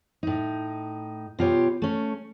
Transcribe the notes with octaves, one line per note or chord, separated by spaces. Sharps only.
A2 D#4
B2 F4 G4 C#5
A3 C#4